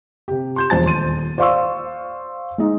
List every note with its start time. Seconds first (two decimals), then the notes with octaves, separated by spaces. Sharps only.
0.28 C3 G4
0.56 C6 G6 E7
0.70 E1 A#1 C5 A5 A6
0.85 D#1 C6 D#7
1.38 C5 D5 F5 C6 C#6 E6
2.58 G#3 D#4